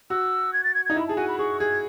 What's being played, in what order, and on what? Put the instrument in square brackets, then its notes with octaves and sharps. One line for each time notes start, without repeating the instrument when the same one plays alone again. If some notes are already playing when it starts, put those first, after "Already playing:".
[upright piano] F#4 [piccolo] E6
[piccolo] G#6
A6
G#6
[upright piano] D#4 [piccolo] G#6
[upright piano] E4 [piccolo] B5
[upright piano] G#4 [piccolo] A5
[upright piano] F#4 [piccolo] G#5
[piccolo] B5
[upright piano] G#4 [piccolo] C#6
[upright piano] G#4 [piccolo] G#6